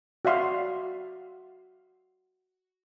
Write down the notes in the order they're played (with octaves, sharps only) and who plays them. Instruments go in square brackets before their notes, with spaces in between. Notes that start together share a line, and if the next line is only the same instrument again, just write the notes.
[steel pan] F#4 D5 E5 F5 C6